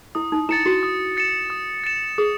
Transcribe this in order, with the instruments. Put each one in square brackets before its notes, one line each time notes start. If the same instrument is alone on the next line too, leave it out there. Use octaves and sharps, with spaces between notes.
[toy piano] E4 [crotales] D#6
[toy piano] D#4
[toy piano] E4 [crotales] A6 C#7 E7
[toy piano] F#4
[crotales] D#6
A6 C#7 E7
D#6
A6 C#7 E7
[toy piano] G#4 [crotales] D#6